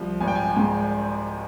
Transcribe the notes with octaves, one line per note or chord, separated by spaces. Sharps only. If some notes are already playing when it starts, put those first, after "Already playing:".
Already playing: C2 F3
G#1 G#5
G5
G#5
G#2